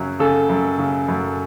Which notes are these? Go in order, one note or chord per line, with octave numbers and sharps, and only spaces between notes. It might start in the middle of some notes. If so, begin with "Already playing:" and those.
Already playing: F#2 C#3 F#3
C#3 A4
F#2
C#3
F#2